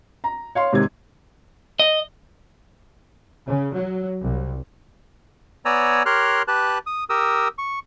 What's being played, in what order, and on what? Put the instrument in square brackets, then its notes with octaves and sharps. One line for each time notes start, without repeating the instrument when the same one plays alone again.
[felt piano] A#5
C#5 F5 C6
G#2 C3 D#3 G#6
[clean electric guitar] D#5
[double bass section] C#3
F#3
C2
[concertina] B3 C#5 D5 G#5 A#5 E6
G4 A#4 C#5 C6 F6 F#6
G4 B4 A5 F#6
D#6
G4 A#4 D#6 E6
C#6